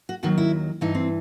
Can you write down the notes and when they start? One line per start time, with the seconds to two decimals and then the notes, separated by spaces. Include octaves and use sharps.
0.09 F#4
0.23 D#2 D#3 F#3 F#4
0.38 E4
0.81 G2 E3 D#4
0.95 C4